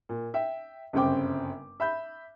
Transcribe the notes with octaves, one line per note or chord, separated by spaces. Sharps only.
A#2
E5 G5
G1 F#2 C#3 C4 G5 D6
E5 B5 G6